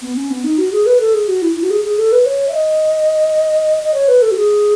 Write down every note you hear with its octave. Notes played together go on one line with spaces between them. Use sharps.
B3
C#4
B3
D#4
F#4
G#4
B4
A4
G#4
F#4
E4
E4
F#4
G#4
G#4
A4
B4
C#5
E5
D#5
D#5
C#5
B4
A4
F#4
G#4